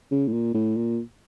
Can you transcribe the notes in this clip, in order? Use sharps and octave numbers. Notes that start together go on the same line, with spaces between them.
C#3
A2
A#2
A2
A#2